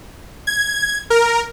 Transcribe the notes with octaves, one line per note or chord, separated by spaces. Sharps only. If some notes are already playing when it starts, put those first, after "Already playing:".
G#6
A#4